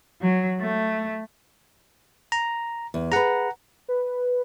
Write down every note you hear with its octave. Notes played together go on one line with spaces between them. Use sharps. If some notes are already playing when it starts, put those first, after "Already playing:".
F#3
A3
A#5
E2
G#4 B4 F#5 A#5
B4